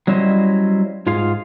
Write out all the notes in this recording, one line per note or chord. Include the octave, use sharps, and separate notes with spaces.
F#3 G3 C#4 E4 C5 D#5
G#2 F4 G#4 F5